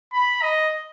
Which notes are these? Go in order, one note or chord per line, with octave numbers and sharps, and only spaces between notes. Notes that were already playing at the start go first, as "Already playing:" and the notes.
B5
D#5